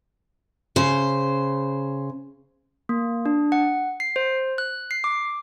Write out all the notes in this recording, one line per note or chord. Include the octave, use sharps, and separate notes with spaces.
C#3 C5
A#3
D4
F#5
C7
C5
F#6
C7
D6